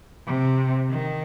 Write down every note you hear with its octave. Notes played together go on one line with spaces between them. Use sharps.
C3
D#3